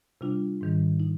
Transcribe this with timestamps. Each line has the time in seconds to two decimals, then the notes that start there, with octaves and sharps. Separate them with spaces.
0.21 C3 G3 D4 F4
0.61 G#2 D#3 G3
1.00 D#4